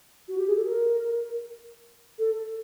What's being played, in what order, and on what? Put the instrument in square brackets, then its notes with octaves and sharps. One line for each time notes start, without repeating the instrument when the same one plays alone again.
[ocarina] F#4
G4
G#4
A4
A#4
A4